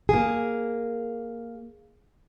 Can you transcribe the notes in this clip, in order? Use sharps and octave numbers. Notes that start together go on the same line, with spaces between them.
A#3 G#4